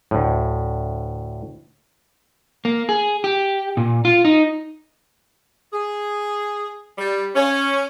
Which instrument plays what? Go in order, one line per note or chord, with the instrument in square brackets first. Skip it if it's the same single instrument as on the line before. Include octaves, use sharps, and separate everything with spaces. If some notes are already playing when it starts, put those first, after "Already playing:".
[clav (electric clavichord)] D2 A2
[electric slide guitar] A#3
G#4
G4
A#2
F4
D#4
[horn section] G#4
G3
C#4